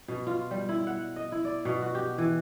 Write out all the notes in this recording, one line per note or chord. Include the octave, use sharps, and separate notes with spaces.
B2
F4
G3
E4
F#5
D#5
E4
D5
B2
F#4
G4
E3